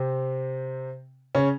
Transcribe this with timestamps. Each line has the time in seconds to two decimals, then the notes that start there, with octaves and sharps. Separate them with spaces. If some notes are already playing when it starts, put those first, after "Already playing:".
Already playing: C3 C4
1.35 C#3 C#4